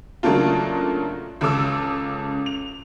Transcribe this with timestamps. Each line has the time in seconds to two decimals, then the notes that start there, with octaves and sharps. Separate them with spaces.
0.23 C#3 F#3 A3 A#3 D4 F4
1.41 C#2 C#3 A4 D6 E6
2.46 F7